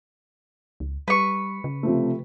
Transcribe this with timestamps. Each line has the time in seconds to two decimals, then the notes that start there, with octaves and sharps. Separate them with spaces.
0.80 C#2
1.08 G3 B4 C#6
1.64 C#3
1.83 C3 F3 A3